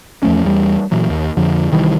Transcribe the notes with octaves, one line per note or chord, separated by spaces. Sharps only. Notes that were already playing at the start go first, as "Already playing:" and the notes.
E2 F3 A3 C#4
E2 G3
A#2 E3 F#3
D#2
F2 D3 F3
C2 D#3 E3 G3